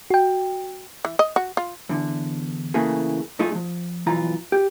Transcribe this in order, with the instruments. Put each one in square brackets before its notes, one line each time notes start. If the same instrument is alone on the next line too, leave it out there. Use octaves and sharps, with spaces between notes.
[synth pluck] F#4 G5
[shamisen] E3
D#5
F#4
F4
[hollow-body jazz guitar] E2 D3
C#3 E3 A3 A#3 G#4
F2 A3 D#4 F4 G#4 C6
F3 G#3
B1 F2 E3 F4 A#5
G4